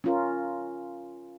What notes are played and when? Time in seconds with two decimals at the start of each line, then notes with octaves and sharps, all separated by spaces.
0.04 C#4 F4 A#4